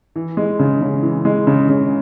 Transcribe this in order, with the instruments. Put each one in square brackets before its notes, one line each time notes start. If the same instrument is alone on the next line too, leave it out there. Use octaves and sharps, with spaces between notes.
[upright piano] E3
G#3
C#3
C#3
E3
G#3
C#3
C#3